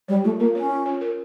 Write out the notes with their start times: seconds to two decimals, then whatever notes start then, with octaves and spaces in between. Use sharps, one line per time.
0.08 G3 C#5
0.24 A3 F4
0.39 A#3 A#4
0.55 C#4 C#5
0.71 F4
0.86 C#5
1.01 A#4